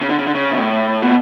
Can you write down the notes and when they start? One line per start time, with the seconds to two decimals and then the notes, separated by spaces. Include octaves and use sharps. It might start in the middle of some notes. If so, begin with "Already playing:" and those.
0.01 C#3
0.09 D3
0.18 C#3
0.27 D3
0.34 C#3
0.52 B2
0.57 A2
1.02 B2